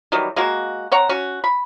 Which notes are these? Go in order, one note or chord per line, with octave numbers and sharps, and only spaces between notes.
D#3 E3 F#3 G3
G#3 A#3 F#4
C4 C#5 F#5 A#5
C#4 F#4
B5